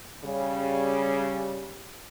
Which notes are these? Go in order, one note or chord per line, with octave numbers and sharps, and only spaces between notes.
C#3 G3